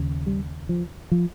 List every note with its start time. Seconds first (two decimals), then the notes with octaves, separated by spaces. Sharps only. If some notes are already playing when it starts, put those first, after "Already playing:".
Already playing: D#2 C#3
0.26 G3
0.69 F3
1.12 F3